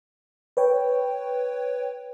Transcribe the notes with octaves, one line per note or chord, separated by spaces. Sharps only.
B4 C#5 G5